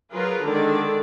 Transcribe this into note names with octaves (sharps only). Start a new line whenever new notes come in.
F#3 F4 G#4 A#4 B4
D3 D#3 G#3 D5